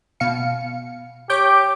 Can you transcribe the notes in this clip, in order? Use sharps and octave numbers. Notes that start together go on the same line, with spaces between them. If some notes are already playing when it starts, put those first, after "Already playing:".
B2 F5 C#7
G4 C#5 D6 G6